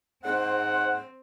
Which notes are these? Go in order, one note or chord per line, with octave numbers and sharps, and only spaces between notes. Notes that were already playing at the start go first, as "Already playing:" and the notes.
G#2 C4 C5 F#5